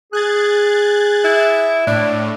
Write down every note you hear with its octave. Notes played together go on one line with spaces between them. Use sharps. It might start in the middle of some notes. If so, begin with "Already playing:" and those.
G#4 F#6 G#6 A6
E4
A2 D4